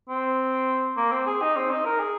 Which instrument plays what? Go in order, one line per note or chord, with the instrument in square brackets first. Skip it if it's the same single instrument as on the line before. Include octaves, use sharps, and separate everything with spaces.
[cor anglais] C4
A#3
C4
G#4
D#4
C4
D#4
A#4
G#4